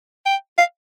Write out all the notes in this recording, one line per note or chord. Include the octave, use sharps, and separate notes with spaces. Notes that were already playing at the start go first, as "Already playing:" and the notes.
G5
F5